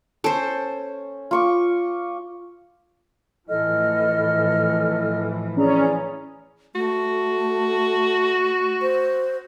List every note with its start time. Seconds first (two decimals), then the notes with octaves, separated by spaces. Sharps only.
0.24 C#4 A4 C5
1.31 F4 C#6 D6
3.49 A2 E3 F3 A4 D#5 F6
5.57 C#4 G#4 D5 A#5
6.75 A3 F#4
8.82 C5